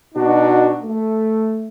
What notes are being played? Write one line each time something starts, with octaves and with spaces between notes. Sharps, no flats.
B2 D4 D#4 F#4
A3